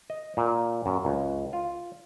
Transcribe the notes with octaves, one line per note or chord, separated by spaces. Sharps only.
D#5
A#2
F#2
C#2
F4